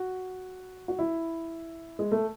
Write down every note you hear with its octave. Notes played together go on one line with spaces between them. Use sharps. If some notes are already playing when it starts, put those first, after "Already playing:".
Already playing: F#4
F#4
E4
G#3
A3